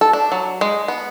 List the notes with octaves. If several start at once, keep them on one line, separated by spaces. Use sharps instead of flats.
A4
D4
F#3
G#3
B3